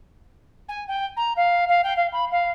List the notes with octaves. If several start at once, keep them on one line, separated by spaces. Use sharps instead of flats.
G#5
G5
A#5
F5
F5
G5
F5
B5
F5